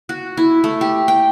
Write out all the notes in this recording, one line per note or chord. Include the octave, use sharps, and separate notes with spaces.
F#4
E4
A3
G4
G5